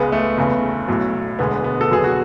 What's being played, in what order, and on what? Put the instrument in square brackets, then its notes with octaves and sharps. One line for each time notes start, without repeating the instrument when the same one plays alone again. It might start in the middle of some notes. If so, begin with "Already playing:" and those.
Already playing: [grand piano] C#2 C#3 G#3 B3
A3
F#1 E2 C#3
B1 A2 F#3
E1 D2 D3 G#3 B3
B3
A4
F#1 E2 D3 F#3 G#4
F#4